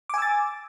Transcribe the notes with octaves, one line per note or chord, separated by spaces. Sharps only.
G#5 D6 E6 A6